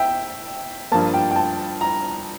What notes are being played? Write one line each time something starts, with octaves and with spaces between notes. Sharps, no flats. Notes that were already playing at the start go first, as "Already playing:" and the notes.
Already playing: E5 G5
G2 F3 A#3 A5
G5
G5
A5
A#5